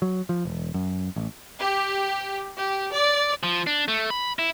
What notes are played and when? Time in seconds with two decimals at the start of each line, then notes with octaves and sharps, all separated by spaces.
0.02 F#3
0.29 F3
0.45 E1
0.74 F#2
1.16 A1
1.59 G4
2.57 G4
2.92 D5
3.43 F3
3.67 D4
3.88 A3
4.10 B5
4.39 E4